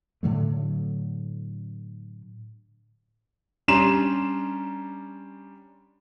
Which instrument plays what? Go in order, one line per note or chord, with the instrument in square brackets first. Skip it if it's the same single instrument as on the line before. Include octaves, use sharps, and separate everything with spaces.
[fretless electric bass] A2 D3 F#3 A3
[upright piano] G3 C#4 D4 A#5 C6 E7